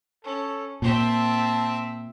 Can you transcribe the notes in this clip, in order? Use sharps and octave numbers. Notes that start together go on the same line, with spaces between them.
C#4 A4
A#2 C4 E5 A5